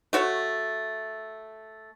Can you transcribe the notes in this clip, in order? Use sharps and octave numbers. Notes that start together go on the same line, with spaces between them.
A3 F#4 C#5